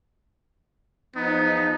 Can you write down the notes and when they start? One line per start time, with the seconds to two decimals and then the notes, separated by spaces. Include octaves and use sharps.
1.15 E2 F3 B3 D#4